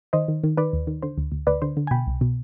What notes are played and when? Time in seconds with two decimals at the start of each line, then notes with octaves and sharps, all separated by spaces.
0.13 D#3 C5 D#5
0.28 D#3
0.44 D#3
0.57 D#3 B4 D5
0.73 D#2
0.87 D#3
1.03 D3 C5
1.18 D2
1.32 D2
1.47 D2 B4 D5
1.62 D3 C5
1.77 D3
1.87 G#5
1.91 B2 G5 B5
2.07 C2
2.21 B2